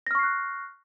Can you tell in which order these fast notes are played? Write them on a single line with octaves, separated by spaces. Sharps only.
A#6 F6 C#6 C7 F#6